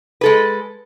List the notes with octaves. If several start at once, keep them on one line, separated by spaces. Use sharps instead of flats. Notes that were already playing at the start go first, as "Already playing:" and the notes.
G#3 A4 B4